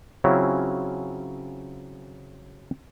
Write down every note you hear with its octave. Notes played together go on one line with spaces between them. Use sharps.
C#3 F#3 C4 C#4 E4 F4